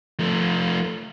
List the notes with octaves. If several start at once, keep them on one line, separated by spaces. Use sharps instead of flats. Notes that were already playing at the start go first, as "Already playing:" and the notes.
F3 A3